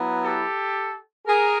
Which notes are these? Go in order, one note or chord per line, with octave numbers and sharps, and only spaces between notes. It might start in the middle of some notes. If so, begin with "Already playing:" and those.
Already playing: F#3 B3 E4
G4 A4
G#4 A#4